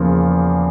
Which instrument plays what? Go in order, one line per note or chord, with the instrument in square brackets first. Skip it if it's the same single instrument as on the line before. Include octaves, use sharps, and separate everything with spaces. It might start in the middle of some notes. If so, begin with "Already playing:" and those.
Already playing: [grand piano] E2 C#3 F3 A#3